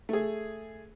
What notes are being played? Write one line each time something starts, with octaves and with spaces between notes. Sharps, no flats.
A3 G#4